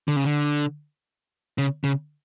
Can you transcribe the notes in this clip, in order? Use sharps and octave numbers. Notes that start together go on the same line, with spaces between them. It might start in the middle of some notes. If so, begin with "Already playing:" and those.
D3
C#3
D3
C#3
C#3